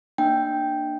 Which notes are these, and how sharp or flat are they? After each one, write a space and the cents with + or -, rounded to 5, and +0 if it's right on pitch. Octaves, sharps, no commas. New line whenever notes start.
A#3 +0 D4 +25 G5 +0